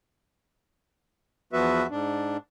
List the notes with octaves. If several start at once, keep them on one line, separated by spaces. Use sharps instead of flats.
E2 F3 B3 F#4 B4 E5
G#2 D4